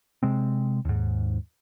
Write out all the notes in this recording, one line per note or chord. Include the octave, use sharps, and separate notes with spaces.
C3 G#3 C4
D#2 G#2